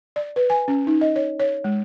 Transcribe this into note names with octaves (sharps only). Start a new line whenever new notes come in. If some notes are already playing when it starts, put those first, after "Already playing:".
D5
B4
G#5
C#4
D#4
D#5
C#5
C#5
G#3